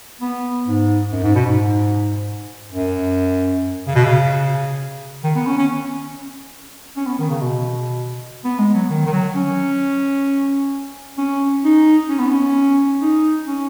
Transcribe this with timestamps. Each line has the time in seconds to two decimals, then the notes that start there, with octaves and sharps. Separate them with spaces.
0.21 B3
0.68 G#2
1.12 F#2
1.24 G#2
1.35 B2
1.47 G#2
2.72 F#2
3.88 C#3
3.95 B2
4.05 C#3
5.24 D#3
5.36 B3
5.47 C#4
5.58 C#4
6.97 C#4
7.07 B3
7.19 D#3
7.30 C#3
7.42 B2
8.45 B3
8.59 G#3
8.74 F#3
8.90 D#3
9.07 D#3
9.13 F#3
9.36 C#4
11.18 C#4
11.65 D#4
12.10 C#4
12.19 B3
12.29 C#4
13.02 D#4
13.48 C#4